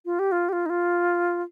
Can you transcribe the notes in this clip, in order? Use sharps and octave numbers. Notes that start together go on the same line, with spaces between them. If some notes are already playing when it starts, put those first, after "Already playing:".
F4
G4
F4
G4
F4
D#4
F4